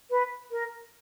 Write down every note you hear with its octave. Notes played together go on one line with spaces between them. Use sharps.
B4
A#4